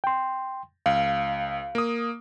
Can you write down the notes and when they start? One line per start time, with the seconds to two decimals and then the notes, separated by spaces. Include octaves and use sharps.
0.04 G5 C6
0.86 C#2 F5
1.75 A#3 D#6